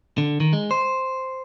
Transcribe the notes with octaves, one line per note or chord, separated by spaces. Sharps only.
D3
D#3
G#3
C5